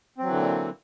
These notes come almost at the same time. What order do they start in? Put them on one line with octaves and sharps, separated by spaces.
C4 F#3 E3 D3 A#2